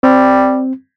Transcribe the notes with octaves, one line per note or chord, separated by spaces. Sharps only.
G3 C4